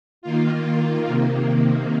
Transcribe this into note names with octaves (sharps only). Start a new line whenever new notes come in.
D#3 A#3 F4
C3 D#3 A#3